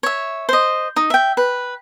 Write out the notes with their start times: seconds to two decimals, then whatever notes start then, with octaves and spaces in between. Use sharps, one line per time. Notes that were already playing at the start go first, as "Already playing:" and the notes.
0.03 C#5 E5
0.49 C5 D#5
0.96 D#4
1.10 E5 G5
1.37 B4